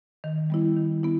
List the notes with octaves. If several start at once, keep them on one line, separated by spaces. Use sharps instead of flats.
D#3
G3 B3 E4
D#3
B3 E4